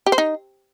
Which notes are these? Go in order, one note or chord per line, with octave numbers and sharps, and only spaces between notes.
G4
C5
D#4